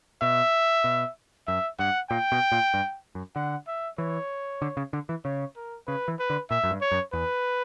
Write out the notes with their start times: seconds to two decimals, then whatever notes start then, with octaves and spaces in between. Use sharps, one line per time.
0.22 B2 E5
0.84 B2
1.47 F#2 E5
1.79 G2 F#5
2.10 A#2 G5
2.32 B2
2.52 A#2
2.74 G2
3.15 F#2
3.35 D3 F#5
3.67 E5
3.98 E3 C#5
4.62 D3
4.77 C#3
4.93 D3
5.09 E3
5.25 C#3 C#5
5.56 A#4
5.87 C#3 B4
6.08 E3
6.19 B4
6.30 D3
6.50 A#2 E5
6.64 F#2
6.71 G2
6.81 C#5
6.92 F#2
7.13 E2 B4